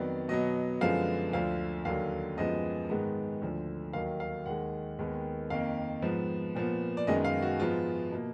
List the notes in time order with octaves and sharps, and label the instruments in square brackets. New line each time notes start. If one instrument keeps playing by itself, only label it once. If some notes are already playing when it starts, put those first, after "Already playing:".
Already playing: [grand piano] F2 D#3 F#3 B3 D5
B2 F#3 B3 D#5
F#2 D3 F3 G#3 B3 F5
D2 D3 F3 F5
D#2 D3 F#3 F5
F#2 F3 G#3 B3 D#5
G#2 D#3 G#3 B3
D2 D3 F3
D#2 D#3 F#3 F5
F5
D#2 D#3 G#3 F#5
D#2 D#3 G#3 B3
F2 D#3 A#3 F5
G#2 F3 B3
A#2 F3 B3
D5
F#2 D#3 G#3 B3 D#5
F5
F#4
G#2 F3 G#3 B3 F4
B2 A#3